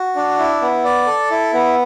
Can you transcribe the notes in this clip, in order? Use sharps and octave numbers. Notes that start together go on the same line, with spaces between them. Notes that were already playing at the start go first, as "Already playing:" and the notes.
Already playing: F#4
D4
E4
B3
D5
A4
E4
B3